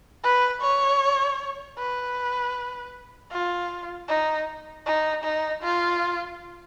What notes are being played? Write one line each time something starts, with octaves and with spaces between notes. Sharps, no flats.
B4
C#5
B4
F4
D#4
D#4
D#4
F4